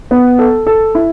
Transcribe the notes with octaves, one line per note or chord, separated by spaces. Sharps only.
B3
A4
A4
E4